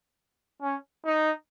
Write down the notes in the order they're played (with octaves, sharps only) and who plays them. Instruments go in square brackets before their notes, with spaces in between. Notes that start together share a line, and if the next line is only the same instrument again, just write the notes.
[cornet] C#4
D#4